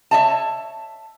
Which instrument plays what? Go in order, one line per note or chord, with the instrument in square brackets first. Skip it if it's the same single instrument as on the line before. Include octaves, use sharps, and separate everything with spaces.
[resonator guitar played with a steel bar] C#5 D#5 E5 A5